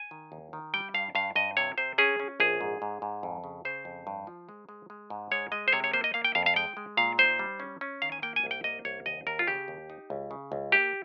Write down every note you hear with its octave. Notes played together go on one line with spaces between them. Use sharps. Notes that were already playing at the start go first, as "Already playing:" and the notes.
Already playing: G#5
D#3
D#2
D#3
G3 G5
G2 F5
G2 F5
G2 D#5
C3 C#5
C3 C5
C#4 G#4
C#4
A#1 G#4
G#2
G#2
G#2
F2
C#3
C#3 C5
F2
G2
F3
G#3
G#3
G#3
G#2
G#3 C#5
G#3 D#5
C5
C3 C#5
C#5
A#3 C5
D#5
A#3 F5
G5
F2 F5
F5
G#3 G5
G#3
A#2 F5
D#4 C5
G3
C#4
C#4
D#3 F5
G#5
A#3 G5
G#5
C2
G5
A#3 D#5
C2 C#5
D#2 D#5
D#2 A#4
F4
C#3 G4
D#2
D#4
C#2
C#3
C#2
A#3 G4